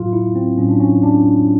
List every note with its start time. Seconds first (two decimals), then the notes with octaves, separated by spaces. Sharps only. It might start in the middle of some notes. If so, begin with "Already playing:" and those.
Already playing: A2 F#3 F4
0.13 E4
0.35 C4
0.58 A2 F#3 C#4
0.69 D4
0.80 C#4
1.03 D4